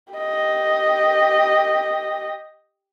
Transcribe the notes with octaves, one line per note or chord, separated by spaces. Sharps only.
G4 D#5